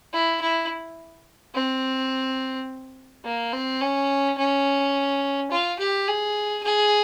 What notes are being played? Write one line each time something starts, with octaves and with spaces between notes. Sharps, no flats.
E4
E4
C4
A#3
C4
C#4
C#4
F4
G4
G#4
G#4